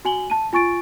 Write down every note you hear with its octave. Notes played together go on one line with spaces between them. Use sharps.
F#4 G#5 F#7 G7
A5 D#7
F4 G#5 C#6 A6 D7